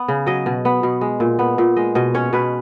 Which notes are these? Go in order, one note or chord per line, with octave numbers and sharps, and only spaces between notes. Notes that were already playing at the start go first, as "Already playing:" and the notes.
Already playing: B3
C#3
F#3 D#5
B2
B3
B2
G#3
A#2
B3
A#2
G#3 D#5
B2 D#5
C#4 C#5
B2 B4